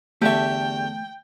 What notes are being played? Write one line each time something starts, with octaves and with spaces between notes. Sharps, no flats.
E2 D3 A3 G4 E5 G5 A5 C#6